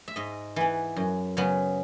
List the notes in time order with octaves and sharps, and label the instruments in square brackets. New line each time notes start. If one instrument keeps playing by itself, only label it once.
[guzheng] E5
G#2 D#5
E3 B3
F#2
C#3 F#3 B3